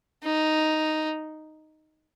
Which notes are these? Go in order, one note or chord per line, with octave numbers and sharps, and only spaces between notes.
D#4